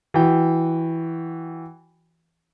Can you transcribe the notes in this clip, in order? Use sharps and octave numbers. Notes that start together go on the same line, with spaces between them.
E3 F#4 G5